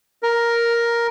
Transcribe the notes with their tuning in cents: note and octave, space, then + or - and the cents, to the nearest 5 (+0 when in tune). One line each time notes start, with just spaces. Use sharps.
A#4 +5